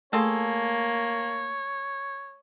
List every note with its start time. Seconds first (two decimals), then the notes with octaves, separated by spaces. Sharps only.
0.13 A3 A#3 F4 G#4 A4 C#5